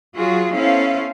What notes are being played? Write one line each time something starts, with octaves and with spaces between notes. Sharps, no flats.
F#3 F4 F#4 G#4
B3 C#4 E4 A4 C5 F5